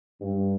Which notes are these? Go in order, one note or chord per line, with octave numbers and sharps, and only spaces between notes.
G2